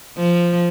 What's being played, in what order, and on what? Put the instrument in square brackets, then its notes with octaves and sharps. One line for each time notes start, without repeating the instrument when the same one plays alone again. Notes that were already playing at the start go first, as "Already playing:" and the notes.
[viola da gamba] F3